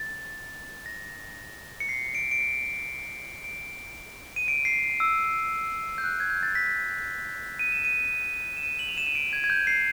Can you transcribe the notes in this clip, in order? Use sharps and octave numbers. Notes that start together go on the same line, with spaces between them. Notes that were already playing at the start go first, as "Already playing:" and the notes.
Already playing: A6
A#6
C#7
C7
D7
D7
C#7
D7
D#7
D7
C7
E6
G6
F#6
G#6
G6
A6
B6
D#7
E7
D#7
E7
D#7
F#7
F7
E7
D#7
D7
G#6
G#6
G6
C7